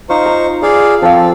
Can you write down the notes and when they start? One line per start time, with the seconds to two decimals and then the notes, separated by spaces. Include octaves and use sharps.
0.10 D#4 F4 C5 C#6
0.26 A#5
0.63 F4 G#4 D5 F5
1.02 F3 C4 A4 F5